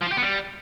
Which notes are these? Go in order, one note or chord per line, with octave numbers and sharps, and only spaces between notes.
F3
F4
G4
B3
G3